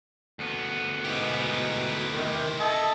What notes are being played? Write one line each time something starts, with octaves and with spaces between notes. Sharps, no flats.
D2 B3
G#2 B2 E4 G4
C3 D#3
A4 D#5